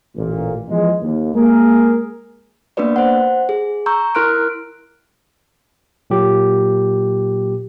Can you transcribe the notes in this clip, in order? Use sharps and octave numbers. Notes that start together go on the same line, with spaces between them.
A1 A#2
E2 F3 G#3
D#2
G#3 A#3 G#4 A#4
A#3 B3 D4 F#4 B4 D5
C5 F#5
G#4
A#5 C#6 E6 G6
E4 A#4 C6 F6 F#6 D7
A#2 F#3 A#3 G4